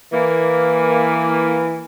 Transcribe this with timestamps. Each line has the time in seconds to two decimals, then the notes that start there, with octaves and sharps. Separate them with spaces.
0.13 E3 A#3